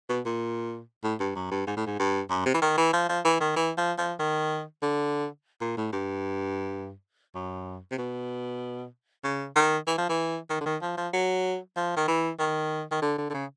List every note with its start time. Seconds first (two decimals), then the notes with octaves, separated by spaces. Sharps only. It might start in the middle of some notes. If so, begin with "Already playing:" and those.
0.09 B2
0.26 A#2
1.04 A2
1.20 G2
1.35 F#2
1.51 G2
1.67 G#2
1.77 A2
1.87 G#2
1.99 G2
2.30 F#2
2.46 C3
2.54 E3
2.62 D#3
2.78 E3
2.93 F3
3.09 F3
3.25 E3
3.40 D#3
3.57 E3
3.77 F3
3.99 F3
4.19 D#3
4.83 D3
5.61 A#2
5.77 A2
5.93 G2
7.35 F#2
7.91 C3
7.98 B2
9.24 C#3
9.55 D#3
9.87 E3
9.98 F3
10.09 E3
10.50 D#3
10.61 D3
10.66 D#3
10.82 F3
10.97 F3
11.13 F#3
11.76 F3
11.97 D#3
12.08 E3
12.39 D#3
12.91 D#3
13.02 D3
13.18 D3
13.30 D3
13.34 C#3